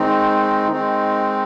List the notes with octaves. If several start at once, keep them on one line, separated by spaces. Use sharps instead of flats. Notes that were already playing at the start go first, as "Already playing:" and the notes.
Already playing: D#3 G#3 C4 D#4
D#3 G#3 C4 D#4